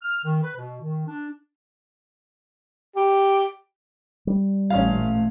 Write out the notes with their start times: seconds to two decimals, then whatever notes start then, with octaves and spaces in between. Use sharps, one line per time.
0.02 F6
0.24 D#3
0.42 B4
0.57 B2
0.82 D#3
1.07 D4
2.96 G4
4.27 G3
4.70 A1 A#2 A3 C#4 F5